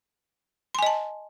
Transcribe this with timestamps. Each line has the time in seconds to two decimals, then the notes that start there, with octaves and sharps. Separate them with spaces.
0.75 C6
0.79 G#5
0.83 D#5
0.86 A5